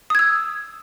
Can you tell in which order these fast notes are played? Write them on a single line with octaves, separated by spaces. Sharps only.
D#6 G#6 E6